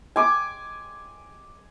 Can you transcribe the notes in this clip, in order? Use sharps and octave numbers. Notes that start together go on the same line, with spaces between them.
G#5 D6